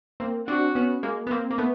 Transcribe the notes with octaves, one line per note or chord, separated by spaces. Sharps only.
A#3 C4
C4 D4 F#4
B3 C#4
G#3 A#3
B3
A#3 C4
A#3
A3 B3